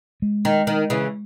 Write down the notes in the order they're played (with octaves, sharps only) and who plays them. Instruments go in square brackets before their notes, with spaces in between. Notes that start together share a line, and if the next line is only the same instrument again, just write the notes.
[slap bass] G#3
[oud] D#3
D#3
C#3 E3